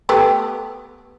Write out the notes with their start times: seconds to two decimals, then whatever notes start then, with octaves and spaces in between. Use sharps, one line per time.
0.09 A3 B3 G4